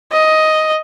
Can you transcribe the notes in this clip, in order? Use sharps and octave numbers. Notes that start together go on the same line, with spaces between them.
D#5